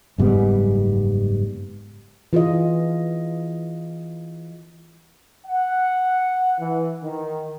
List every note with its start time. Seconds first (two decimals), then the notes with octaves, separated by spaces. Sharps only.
0.18 F#1 G#2 G3 B3
2.33 E3 F4 G#4 D#5
5.47 F#5
6.60 E3
7.04 D#3